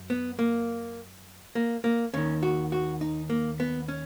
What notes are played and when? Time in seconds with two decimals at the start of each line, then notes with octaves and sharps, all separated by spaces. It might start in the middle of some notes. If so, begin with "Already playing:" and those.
Already playing: F#2
0.10 B3
0.39 A#3
1.55 A#3
1.84 A#3
2.14 D#2 D#3 C#4
2.43 F#4
2.72 F#4
3.01 D#4
3.30 A#3
3.60 B3
3.88 C#4